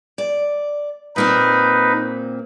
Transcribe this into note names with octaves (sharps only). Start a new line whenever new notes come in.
D5
A#2 A#3 C4 D#4 B4